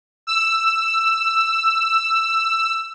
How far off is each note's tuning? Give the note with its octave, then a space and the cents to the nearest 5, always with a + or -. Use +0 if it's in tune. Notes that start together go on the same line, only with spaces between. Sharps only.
E6 +10